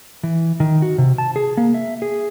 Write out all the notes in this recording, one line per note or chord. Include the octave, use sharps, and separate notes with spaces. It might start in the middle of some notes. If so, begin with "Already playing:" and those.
E3
D#3
F#4
C3
A5
G#4
A#3
E5
G#4